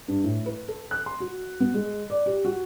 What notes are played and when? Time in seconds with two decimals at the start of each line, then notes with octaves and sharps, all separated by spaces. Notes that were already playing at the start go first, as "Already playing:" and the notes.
0.08 G2
0.24 A2
0.46 B4
0.68 A4
0.91 F#6
1.06 C6
1.20 F#4
1.60 B3
1.74 G#3
2.10 D5
2.26 G4
2.45 F#4